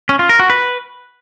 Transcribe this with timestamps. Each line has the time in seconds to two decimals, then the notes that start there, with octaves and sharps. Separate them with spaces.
0.09 C#4
0.19 F4
0.29 A#4
0.40 F#4
0.50 B4